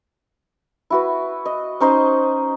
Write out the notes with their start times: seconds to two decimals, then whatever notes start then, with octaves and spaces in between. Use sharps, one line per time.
0.90 E4 F#4 B4
1.45 D#5
1.80 C#4 D#4 C5 D#5